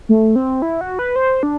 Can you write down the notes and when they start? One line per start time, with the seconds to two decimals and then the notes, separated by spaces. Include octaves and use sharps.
0.09 A3
0.36 C4
0.62 E4
0.81 F#4
0.99 B4
1.16 C5
1.43 D4